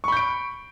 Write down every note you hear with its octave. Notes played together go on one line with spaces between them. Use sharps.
B5 C#6 G6 D7